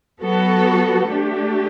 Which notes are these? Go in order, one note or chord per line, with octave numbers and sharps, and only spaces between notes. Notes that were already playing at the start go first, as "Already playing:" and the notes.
F#3 B3 F#4 A4
A3 D4 G4